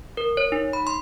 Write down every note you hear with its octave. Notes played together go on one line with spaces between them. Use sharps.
A#4
C#5
D#4
B5
C6